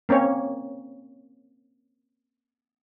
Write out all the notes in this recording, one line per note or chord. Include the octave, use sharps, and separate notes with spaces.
A#3 C4 C#4 C#5